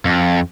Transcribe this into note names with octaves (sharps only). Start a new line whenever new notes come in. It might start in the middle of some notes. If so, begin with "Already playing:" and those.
F2